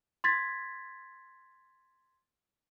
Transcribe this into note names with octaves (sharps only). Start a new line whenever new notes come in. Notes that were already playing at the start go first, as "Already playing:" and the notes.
C6 G#6 A6 B6